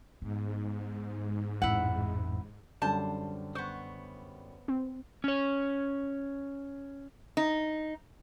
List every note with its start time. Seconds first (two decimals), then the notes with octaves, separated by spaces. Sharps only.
0.22 G#2 B3
1.62 A1 F2 E4 F#5
2.82 F#2 D3 G3 C5 A5
3.55 B3 C5 C#6
4.68 C4
5.24 C#4 C#5
7.37 D#4